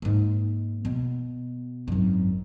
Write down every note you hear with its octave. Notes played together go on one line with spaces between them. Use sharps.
G#2 A#3
B2
G#1 F#2